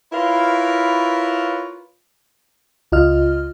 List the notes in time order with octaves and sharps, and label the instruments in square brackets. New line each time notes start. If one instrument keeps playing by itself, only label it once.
[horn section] E4 F4 A#4 B4 C#5
[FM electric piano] C#2 F4 D#5 F6